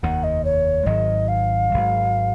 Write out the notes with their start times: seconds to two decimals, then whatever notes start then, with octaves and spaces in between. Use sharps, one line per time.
0.03 F1 D#2 D#3 F#5
0.24 D#5
0.45 C#5
0.86 G#1 G#2 F#3 D#5
1.28 F5
1.69 G#1 G#2 F#3